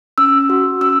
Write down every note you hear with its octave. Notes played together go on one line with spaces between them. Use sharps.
C#4 E6
F#4
C#4 E6